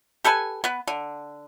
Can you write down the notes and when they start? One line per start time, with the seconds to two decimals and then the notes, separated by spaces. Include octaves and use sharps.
0.24 G4 A4 B4 G#5
0.64 B3 B4
0.87 D3